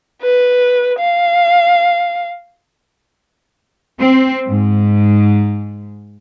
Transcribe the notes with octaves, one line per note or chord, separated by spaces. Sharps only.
B4
F5
C4
G#2